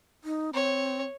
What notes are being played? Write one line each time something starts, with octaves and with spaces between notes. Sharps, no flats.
D#4
C4 C#5